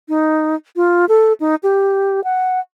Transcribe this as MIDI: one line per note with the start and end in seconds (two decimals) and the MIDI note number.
0.09 0.55 63
0.76 1.05 65
1.09 1.33 69
1.40 1.55 63
1.63 2.23 67
2.24 2.60 78